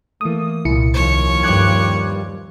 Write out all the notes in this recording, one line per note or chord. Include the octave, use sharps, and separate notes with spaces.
E3 A3 A#3 D#6
C2 A#2 E4 C#7
D#2 F3 C#5
G2 G3 D6 F#6 G#6